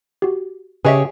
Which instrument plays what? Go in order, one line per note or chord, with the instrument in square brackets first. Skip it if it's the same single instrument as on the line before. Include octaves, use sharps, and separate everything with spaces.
[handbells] F#4 G4
[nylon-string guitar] C#3 G4 C#5 [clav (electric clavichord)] G#4 [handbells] B4 D#5 E5